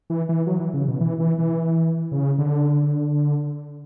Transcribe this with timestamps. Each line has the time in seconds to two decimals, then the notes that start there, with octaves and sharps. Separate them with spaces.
0.10 E3
0.29 E3
0.47 F#3
0.60 E3
0.74 C#3
0.88 B2
1.01 E3
1.20 E3
1.38 E3
2.11 C#3
2.38 D3